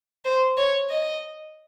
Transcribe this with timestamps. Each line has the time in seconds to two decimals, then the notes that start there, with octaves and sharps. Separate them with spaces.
0.25 C5
0.57 C#5
0.89 D#5